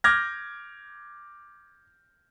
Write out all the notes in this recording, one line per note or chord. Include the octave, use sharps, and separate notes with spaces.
D6 F6 G6 G#6 A#6